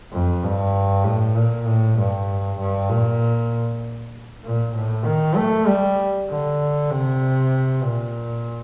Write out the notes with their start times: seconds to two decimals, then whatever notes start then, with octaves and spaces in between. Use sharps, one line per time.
0.12 F2
0.43 G2
1.04 A2
1.35 A#2
1.66 A2
1.98 G2
2.59 G2
2.90 A#2
4.44 A#2
4.76 A2
5.05 D#3
5.36 A3
5.67 G3
6.30 D3
6.91 C3
7.83 A#2